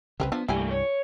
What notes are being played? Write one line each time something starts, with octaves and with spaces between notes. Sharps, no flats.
C2 C#3 C4 A#4 B4
F3 B3 D4
C2 G2 E3 G3 A3 A#3 G#5
C#5